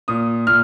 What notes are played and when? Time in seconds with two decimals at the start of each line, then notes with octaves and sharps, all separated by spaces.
0.08 A#2 D#6
0.47 A#2 F6